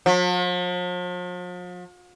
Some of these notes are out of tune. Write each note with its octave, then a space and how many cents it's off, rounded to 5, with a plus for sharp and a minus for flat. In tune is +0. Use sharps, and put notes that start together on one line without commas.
F3 +45